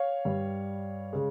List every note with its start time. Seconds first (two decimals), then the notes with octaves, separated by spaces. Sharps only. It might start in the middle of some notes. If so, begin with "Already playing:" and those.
Already playing: C#5 F5
0.25 G2 G3
1.13 C#3 G#3